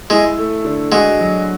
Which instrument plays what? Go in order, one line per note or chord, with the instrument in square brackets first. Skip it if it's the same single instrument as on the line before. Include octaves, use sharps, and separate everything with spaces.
[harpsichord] G#3 [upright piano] E4
[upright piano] A3
D3
[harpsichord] G#3 [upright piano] F#4
[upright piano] F#3